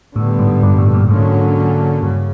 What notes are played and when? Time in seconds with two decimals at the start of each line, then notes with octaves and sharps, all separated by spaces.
0.16 A2 D3 G3 B3
0.39 G#2
0.63 G2
0.78 A2
0.94 A#2
1.09 G#2 D3 F#3 A#3 C#4
2.03 G2 C#3